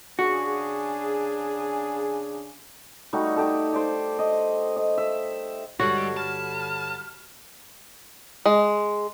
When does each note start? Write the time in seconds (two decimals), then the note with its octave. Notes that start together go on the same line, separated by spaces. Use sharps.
0.19 C#3 D4 F#4 G#4
3.13 G3 A3 D#4 F#4
3.36 D#4 G4 A4
3.74 C5 D5
4.19 D#5
4.76 D#5
4.98 E5
5.80 G2 D3 G3 G#3 F#4 A4 C#5
6.17 D3 A5 B5 F6
8.46 G#3